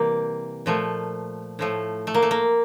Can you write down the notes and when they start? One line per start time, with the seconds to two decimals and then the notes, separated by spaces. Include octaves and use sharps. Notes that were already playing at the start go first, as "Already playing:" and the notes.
Already playing: C3 E3 G3 A#3
0.66 A#2 F3 A3
1.59 A2 F3 A3
2.07 A3
2.15 A#3
2.22 A3
2.31 A#3